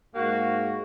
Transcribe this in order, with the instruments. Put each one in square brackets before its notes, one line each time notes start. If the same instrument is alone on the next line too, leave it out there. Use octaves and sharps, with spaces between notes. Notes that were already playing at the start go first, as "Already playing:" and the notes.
[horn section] G#2 A#3 F#4